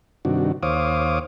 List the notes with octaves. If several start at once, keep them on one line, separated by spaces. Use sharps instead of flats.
G2 C3 D#3 D4 F#4
D#2 C5 C#5 F5 D6 D#6